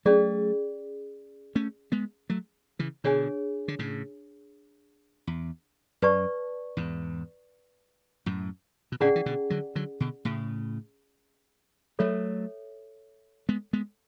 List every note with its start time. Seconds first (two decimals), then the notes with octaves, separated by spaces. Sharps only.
0.05 F#3 A3 C#4 G#4 D5
1.55 A3 C#4
1.92 G#3 B3
2.30 F#3 A3
2.79 C#3 E3
3.04 B2 D3 D4 G#4 C#5 G#5
3.68 D3
3.79 A2 C#3
5.27 E2
6.02 F#2 B4 D5 A5 C#6
6.77 E2 G#2
8.26 F#2 A2
8.92 B2
9.00 A2 C#3 C#4 G#4 D5 F#5 A5
9.16 E3
9.26 B2 D3
9.50 D3 F#3
9.76 D3 F#3
10.00 B2 D3
10.25 A2 C#3
11.99 F#3 A3 A4 C#5 E5
13.49 G#3 B3
13.73 G#3 B3